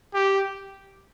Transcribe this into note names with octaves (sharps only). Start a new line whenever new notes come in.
G4